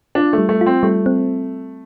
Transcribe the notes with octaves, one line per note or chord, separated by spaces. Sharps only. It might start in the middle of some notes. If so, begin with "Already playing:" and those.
D4 F4
G3 A3
A3
F4
C4
G3 A3
C4